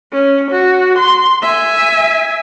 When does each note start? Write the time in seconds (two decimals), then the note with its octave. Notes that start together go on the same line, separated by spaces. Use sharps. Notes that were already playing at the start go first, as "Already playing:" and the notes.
0.12 C#4
0.51 F#4
0.98 C6
1.43 E5 G#5